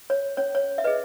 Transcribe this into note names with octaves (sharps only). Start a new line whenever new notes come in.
C#5
C#4 C#5
C#5
E5
G#4 B4 D#5